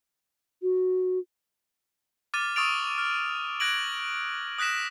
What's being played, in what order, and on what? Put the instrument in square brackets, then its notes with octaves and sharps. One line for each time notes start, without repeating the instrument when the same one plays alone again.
[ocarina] F#4
[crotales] D6 F6 A6 D#7
C#6 D#6 E6 A6 D7 F7
F6
F#6 G#6 A#6 D7 F#7
D#6 F#6 A#6 B6 E7